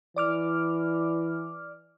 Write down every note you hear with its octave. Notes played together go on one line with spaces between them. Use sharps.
E3 D5 D6 F6